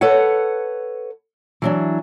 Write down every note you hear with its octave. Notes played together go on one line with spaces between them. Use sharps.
A4 B4 C#5 F#5
E3 F#3 D4